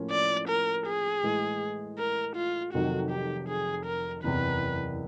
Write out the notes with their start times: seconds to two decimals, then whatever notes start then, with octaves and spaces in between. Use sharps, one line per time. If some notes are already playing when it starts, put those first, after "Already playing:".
Already playing: A2 F3 A#3 C#4
0.11 D5
0.48 A#4
0.86 G#4
1.23 A2 E3 G#3
1.98 A#4
2.36 F4
2.73 F1 F2 C3 D#3 F#3 F#4
3.11 G4
3.48 G#4
3.86 A#4
4.23 F#1 E2 C3 B4